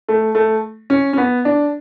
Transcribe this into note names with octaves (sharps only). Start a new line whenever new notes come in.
A3
A3
C#4
C#4
B3
D4